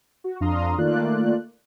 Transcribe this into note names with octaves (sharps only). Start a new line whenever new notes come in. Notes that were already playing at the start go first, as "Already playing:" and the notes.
F#4
F2 D4 F5 A#5 C6 D#6
D#3 A3 A#3 F4 D5 F#6